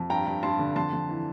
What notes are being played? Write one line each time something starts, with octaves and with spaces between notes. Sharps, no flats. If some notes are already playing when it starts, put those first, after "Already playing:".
Already playing: F2
G2 G5 A#5
G2
G2 A5 C6
D3
F2 A5 C6
F2
E3